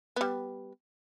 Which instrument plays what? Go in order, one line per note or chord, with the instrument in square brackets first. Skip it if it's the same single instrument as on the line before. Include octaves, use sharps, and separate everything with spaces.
[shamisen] G3 B3